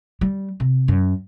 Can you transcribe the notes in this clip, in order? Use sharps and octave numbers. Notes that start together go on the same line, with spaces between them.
G3
C3
F#2